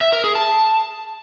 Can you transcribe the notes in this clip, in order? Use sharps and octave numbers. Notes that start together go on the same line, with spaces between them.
E5
A#4
G#4
A5